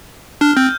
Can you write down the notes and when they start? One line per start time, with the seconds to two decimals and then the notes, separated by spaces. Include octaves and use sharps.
0.41 D4 F6
0.56 C4 G6